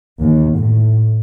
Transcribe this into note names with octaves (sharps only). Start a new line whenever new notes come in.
D#2
A2